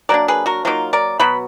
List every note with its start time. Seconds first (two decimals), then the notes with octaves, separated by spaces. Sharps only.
0.09 F#3 A#3 D4 A#4 D5
0.28 G#4 B4
0.46 F#4 A#4
0.65 F#3 A#3 D#4 F4
0.93 A#4 D5
1.19 B2 F#3 B3 B5